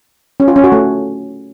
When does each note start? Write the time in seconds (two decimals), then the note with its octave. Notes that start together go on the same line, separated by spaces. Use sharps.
0.40 C#4
0.48 F4
0.56 C#4
0.64 F#4
0.72 A3